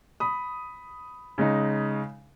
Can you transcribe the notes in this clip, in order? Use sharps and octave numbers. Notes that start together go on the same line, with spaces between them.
B5 D#6
C#3 G#3 D#4